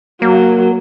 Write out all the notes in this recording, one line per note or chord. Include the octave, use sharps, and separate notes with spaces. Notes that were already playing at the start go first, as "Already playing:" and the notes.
F#3 A#3